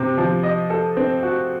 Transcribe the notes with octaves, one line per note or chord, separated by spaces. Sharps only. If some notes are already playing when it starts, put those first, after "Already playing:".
Already playing: C3 C4
F3
D#5
A4
C4
F#4